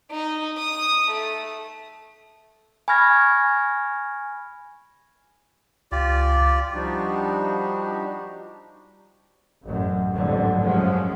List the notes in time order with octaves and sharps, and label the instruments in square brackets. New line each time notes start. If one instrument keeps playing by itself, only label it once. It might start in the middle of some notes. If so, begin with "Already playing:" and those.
[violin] D#4
D#6
A3
[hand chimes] G#5 B5 C#6 F6 G#6 A#6
[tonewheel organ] C#2 [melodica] F4 G4 D5
[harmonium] F3 G3 D4 D#4 F#4 G4
[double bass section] A1 F#2
A1 F2 G#2 D3 F#3
F#2 F3 F#3 G#3 C#4